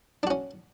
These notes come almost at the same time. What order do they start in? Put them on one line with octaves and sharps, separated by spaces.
D4 F#4 C#4